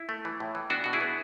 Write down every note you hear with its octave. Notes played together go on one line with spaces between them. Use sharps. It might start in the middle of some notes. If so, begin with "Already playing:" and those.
Already playing: E4
A3
E3
A2
E3
B3 D4 F#4
B2 F#4
E4 G#4
B3